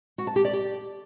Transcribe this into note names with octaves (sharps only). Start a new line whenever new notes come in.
F#4
A5
G4
D5
G4